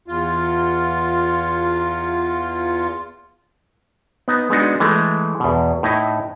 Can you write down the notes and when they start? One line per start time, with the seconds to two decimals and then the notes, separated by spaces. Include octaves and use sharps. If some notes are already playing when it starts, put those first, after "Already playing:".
0.08 E2 F4
4.28 B3 D#4 A#5
4.50 G#3 B3 D4 D#4 F#4
4.80 E3 G#3 A3
5.40 E2 B2
5.83 A2 D#4 E4 D#5